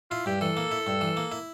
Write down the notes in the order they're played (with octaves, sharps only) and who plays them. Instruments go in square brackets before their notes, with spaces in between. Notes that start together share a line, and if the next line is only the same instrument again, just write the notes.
[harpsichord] E4 [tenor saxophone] F4
[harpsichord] G2 [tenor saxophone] G4
[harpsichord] E3 [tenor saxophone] A4
[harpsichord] A#3
E4
G2
E3
A#3
E4